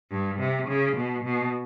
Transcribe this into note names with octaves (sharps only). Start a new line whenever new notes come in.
G2
C3
C#3
B2
B2